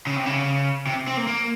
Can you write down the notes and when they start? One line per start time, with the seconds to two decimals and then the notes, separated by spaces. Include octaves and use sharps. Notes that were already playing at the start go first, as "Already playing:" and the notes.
0.07 C#3
0.16 C3
0.26 C#3
0.87 C3
1.07 C4
1.17 A#3
1.27 A#3